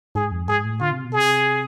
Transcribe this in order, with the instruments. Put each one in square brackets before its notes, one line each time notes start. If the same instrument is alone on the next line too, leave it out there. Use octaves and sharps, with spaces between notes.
[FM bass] G#2 [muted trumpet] G#4
[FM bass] F2
[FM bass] G#2 [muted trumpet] G#4
[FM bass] A2
[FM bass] D3 [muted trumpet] F4
[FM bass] C3
B2
[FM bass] C3 [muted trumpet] G#4